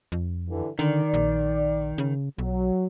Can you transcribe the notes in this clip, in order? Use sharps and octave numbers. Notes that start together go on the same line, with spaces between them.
F2
G2 D3 E3
D3 D#3 D5
A#1
C#3
B1 F#3